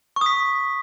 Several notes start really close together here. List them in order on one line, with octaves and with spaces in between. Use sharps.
C#6 D#6 B6